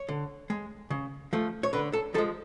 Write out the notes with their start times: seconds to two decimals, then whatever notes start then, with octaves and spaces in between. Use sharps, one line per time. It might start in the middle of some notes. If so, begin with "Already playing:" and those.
Already playing: C#5
0.08 D3
0.50 G#3
0.90 C#3
1.33 F3 A3
1.63 C#5
1.73 D3 B4
1.93 A4
2.14 F3 A4
2.18 G#3